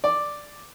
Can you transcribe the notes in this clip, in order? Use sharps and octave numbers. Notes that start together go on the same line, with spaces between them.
D5